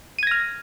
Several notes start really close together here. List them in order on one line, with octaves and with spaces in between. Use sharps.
D#7 G#6 A#6 F6